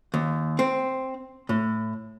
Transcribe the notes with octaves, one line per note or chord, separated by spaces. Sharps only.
D#2
C4
A2